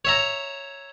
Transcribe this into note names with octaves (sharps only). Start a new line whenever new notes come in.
C#5 E5 A#5